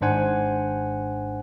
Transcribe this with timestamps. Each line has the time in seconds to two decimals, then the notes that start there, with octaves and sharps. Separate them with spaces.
0.01 G#1 G#2 D4 C5 F#5 G#5